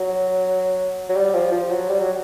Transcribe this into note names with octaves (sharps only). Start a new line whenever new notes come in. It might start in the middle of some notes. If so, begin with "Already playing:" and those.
Already playing: F#3
F#3
G3
F3
F3
F#3
G3
F#3